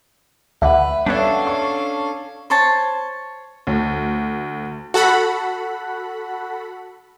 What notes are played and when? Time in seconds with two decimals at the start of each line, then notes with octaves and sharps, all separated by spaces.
0.62 D2 D3 B4 E5 F#5
1.06 G3 B3 C#4 D4 A4 C#5 F5
1.47 C#6
2.50 C5 C#5 A5
3.67 D2
4.94 F#4 A4 F#5 B5